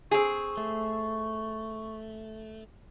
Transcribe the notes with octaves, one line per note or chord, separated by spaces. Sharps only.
C4 G#4 C#6
A3